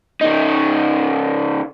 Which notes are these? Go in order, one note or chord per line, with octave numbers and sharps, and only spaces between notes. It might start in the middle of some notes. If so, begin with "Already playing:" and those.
C#3 D#4